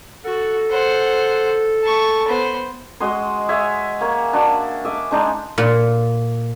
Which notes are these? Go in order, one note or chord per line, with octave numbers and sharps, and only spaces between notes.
F#4 A4
C5 F#5
A5 C#6
B3 C5
G#3 F#4 D#5 C6
G#4 C#5 E5 G#5
A#3 C#5
D4 F#4
D#5 E5 D6
G#3 D4 D#4 G#4
A#2